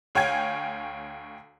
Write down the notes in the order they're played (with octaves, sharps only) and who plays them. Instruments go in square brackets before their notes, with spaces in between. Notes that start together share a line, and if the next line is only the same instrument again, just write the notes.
[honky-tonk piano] D2 C#5 F5 G5 G#5 G#6